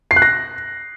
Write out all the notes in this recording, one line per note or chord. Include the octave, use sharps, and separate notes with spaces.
C7
F#6
A#6